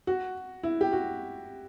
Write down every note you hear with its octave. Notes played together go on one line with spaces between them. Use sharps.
F#4
E4
G4
F#4